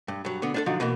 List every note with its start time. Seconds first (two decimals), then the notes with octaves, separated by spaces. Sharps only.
0.08 G2
0.25 G2 F#3
0.42 D3 B3
0.54 D4 D#4 A4
0.66 D3 F3 F#3 D#4
0.80 B2 E3 A#3